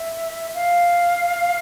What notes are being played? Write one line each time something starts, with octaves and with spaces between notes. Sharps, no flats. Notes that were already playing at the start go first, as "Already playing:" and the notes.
Already playing: E5
F5